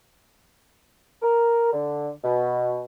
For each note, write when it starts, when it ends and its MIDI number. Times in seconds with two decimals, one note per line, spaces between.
1.22 1.70 70
1.73 2.09 50
2.23 2.84 47